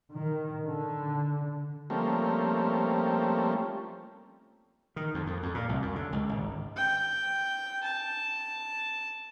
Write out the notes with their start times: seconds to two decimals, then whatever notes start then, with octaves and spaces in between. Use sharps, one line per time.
0.12 D#3
0.64 D3
1.90 F3 G3 A3 A#3 C4 C#4
4.96 D#3
5.14 F2
5.27 F2
5.43 F2
5.54 A#2
5.69 C2
5.82 F#2
5.96 D3
6.12 C#2
6.29 G#1
6.76 G5
7.83 A5